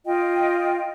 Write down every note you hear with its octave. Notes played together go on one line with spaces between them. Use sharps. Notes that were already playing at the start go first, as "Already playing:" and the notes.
F4 D#5 G5